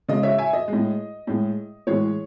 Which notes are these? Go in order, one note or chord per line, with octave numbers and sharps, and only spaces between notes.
C#3 G#3 D#5
C#5 E5
E5 G#5
D#5
A2 G#3
A2 G#3
A2 E3 G#3 C#5